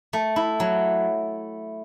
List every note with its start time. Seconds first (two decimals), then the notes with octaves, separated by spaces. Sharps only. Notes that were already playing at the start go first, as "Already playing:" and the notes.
0.13 A3
0.36 E4
0.60 F#3